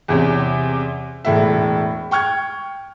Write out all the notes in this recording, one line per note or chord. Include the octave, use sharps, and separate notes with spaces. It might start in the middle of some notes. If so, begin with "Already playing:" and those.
E2 C3 C#4
E1 A2 E5
G5 C#6 F6 G#6